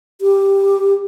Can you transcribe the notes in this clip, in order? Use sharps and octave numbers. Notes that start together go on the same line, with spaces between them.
G4